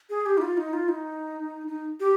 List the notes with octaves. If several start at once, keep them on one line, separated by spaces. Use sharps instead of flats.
G#4
G4
D#4
F4
D#4
F4
D#4
D#4
G4